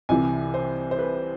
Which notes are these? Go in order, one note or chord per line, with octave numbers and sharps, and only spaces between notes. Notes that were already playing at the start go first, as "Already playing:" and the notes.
C2 C3 E3 G#5
C5
C5
B4